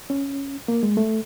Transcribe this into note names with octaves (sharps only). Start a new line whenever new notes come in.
C#4
A#3
G#3
A3